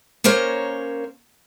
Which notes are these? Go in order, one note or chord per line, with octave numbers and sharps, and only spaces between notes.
A#3 C#4 A#4 C5 C#5